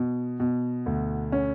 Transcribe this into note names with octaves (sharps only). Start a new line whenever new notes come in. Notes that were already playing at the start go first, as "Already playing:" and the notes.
Already playing: B2
B2
D2
C#4